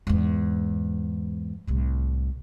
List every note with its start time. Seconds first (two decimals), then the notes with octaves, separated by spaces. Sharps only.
0.07 E2 G#2
1.67 C2 A2